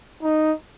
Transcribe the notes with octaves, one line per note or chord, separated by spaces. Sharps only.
D#4